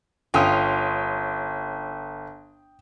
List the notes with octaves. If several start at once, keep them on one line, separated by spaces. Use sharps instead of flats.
G1 C#4 F4 G5 D#6